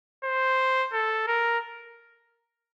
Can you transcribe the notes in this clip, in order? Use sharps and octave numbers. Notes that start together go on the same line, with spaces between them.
C5
A4
A#4